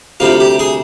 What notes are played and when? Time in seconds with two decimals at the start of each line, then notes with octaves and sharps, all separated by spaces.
0.20 D2 C3 G3 F4
0.40 G4
0.59 G#4